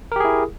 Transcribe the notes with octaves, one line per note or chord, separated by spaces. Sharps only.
E4 G4 G#4 A#4